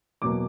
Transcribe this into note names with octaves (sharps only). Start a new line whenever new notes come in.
E2 B2 F#3 A#3 D6